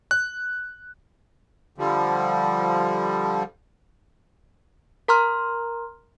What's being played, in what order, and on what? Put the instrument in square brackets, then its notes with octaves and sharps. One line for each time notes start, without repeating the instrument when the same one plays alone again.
[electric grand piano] F#6
[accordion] D3 F3 G3
[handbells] A#4 A#5 C6 F6